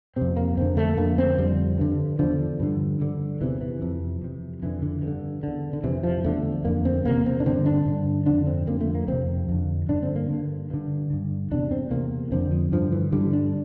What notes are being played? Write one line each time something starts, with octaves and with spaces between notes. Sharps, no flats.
F2 C3 C4
A#3
F2 D3 C4
A3
F2 D3 A#3
C4
F2 D3 G3
G2 D3
E2 D3 F3
G2 D3
G2 D3
E2 C3 E3
E3
F2 C3
F2 C3
F2 D3 E3
D3
G2
D3
E2 D3
D3
F2 C3 E3
F3
E2 D3 A3
F2 D3 A#3
C4
E2 C3 A#3
C4
D4
G2 D3 C4
D4
G2 D3
F2 D3 D4
C4
F2 D3 A#3
A3
A#3
F2 C3 C4
F2 D3
G2 D3 D4
C4
A#3
G2 D3
G2 D3
G2 D3
E2 C3 D4
C4
E2 C3 A#3
F2 D3 C4
F3
G2 D3 F3
E3
G2 D3 G3
D4